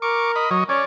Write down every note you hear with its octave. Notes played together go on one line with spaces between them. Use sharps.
A#4 C#6 D6
D#5 B5
F#3 C#5 D#5
C#4 C#5 D5